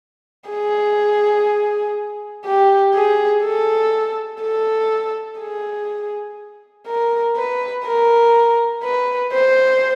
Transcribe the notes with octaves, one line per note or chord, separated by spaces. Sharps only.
G#4
G4
G#4
A4
A4
G#4
A#4
B4
A#4
B4
C5